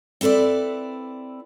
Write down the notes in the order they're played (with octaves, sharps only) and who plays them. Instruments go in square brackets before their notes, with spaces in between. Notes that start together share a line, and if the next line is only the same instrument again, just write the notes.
[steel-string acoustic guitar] C4 E4 A4 B4 D5